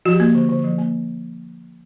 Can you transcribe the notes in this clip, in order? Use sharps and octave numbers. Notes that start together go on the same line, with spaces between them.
F3 F#4
G4
A#3 F#4
D3
D3
F3
A#3